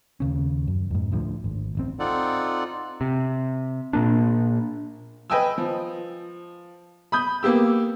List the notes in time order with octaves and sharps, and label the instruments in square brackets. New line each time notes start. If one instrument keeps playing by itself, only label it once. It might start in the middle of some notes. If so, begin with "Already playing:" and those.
[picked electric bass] D#2 C#3 C#4
F#2
F2 G#2
D2 A2 D3 F3
G#1
D1 A1 C4
[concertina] C4 D#4 F4 A4 D5 F#5
[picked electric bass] C3
A#2 A#3 D4
[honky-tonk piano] B4 D#5 G5 G#5 D#6 E6
F3
B5 D#6 G6
A#3 B3 G4 E6